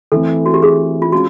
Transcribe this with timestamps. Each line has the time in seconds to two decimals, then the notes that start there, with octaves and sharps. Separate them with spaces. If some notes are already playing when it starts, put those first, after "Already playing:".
0.12 E3 A3 C4 A4
0.46 F#4
0.54 G4
0.62 G#4
1.02 F4
1.12 G#3 C#4 F4 F#4